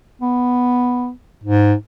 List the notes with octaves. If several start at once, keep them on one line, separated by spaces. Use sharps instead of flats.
B3
G#2